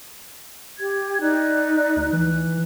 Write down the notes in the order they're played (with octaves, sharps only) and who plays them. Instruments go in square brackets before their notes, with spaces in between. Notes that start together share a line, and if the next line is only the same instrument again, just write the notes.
[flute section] G4 G#6
D#4 D5 F#6
[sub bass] D2
[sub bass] E3 [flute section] F#6